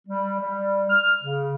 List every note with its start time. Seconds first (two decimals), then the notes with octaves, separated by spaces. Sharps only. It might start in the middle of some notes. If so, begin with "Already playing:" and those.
0.08 G3
0.39 G3
0.89 F6
1.23 C#3